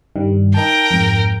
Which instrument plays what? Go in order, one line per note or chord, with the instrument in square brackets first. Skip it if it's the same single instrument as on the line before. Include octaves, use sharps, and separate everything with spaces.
[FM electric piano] G2 D#3 G3
[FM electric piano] D#4 A5 [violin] A#4 G5
[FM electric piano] F2 G#2